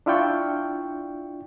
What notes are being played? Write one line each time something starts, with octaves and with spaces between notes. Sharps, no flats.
D4 E4 F4 D5 G5 C#6